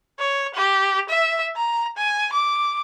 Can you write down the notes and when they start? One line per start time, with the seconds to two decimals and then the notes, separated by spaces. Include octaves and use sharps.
0.19 C#5
0.54 G4
1.09 E5
1.56 A#5
1.97 G#5
2.33 D6